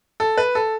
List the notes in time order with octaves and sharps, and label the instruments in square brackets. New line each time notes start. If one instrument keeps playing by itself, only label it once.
[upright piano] A4
B4
A4